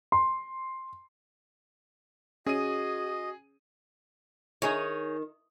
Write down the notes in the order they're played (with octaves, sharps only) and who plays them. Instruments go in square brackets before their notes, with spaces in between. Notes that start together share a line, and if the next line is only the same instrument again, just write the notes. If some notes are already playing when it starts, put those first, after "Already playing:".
[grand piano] C6
[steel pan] C#4 [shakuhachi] F#4 [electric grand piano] G#4 D#7 [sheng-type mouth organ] D#5
[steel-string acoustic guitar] D#3 [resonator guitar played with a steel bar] D#4 G#4 C#5